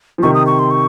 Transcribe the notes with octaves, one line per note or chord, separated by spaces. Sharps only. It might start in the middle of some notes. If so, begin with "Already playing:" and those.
F3
C3 D#3 C#6
D#6
C#6
C6
C#6